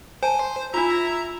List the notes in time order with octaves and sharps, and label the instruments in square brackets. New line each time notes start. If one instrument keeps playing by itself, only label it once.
[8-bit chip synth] C5 [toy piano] G#5 A5
[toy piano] D4 F4 [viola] E4 E5 [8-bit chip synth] A#5